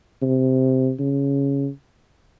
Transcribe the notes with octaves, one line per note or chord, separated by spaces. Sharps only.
C3
C#3